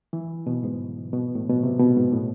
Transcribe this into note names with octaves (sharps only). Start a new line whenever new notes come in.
E3
B2
G#2
B2
A2
B2
C3
B2
G#2
A2